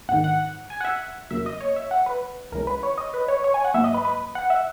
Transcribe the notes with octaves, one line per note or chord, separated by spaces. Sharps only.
A#1 G#2 D#3 F#5
F#5
G#5
F#5
E5
E2 C#3 F#3 A#3 E5
D#5
C#5
E5
F#5
B4
C#2 C#3 E3 G#3 A#4
B4
C#5
D#5
B4
C#5
C#5
G#5
F#5
G#2 F#3 A#3 E5
D#5
B4
B4
F#5
E5